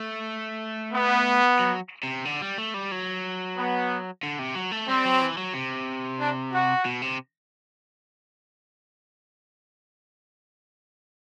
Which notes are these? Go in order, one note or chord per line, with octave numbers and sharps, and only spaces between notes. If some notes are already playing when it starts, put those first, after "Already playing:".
Already playing: A3
B3
F#3
C3
D3
G3
A3
G3
F#3
B3
D3
C3
F#3
A3
G3 C4
F#3
E3
F#3
C3
D4
F#4
B2
C3